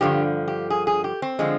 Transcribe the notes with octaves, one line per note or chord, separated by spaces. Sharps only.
G2 D3 F3 G4
G4
G#4
G#4
G4
C4
D3 F3 G#3